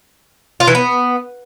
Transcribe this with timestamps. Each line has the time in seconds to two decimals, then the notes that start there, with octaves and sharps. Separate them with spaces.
0.60 F4
0.67 E3
0.75 B3